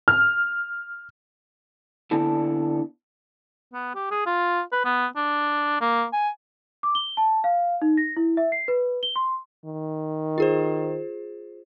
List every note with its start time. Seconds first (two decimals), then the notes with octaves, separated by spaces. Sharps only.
0.08 F6
2.11 D3 B3 D4 E4 A4
3.73 B3
3.95 G4
4.11 G#4
4.26 F4
4.72 B4
4.85 B3
5.16 D4
5.81 A#3
6.13 G#5
6.83 D6
6.95 G7
7.17 A5
7.44 F5
7.82 D#4
7.97 A#6
8.17 E4
8.37 E5
8.52 C7
8.68 B4
9.03 G7
9.16 C6
9.65 D#3
10.38 F4 G#4 C5